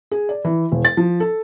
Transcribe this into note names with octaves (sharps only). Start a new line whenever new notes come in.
G#4
D5
E3
E1
A6
F3
A4